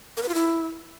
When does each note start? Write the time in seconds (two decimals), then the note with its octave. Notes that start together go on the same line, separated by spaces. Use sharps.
0.17 A#4
0.23 B4
0.28 F4
0.34 E4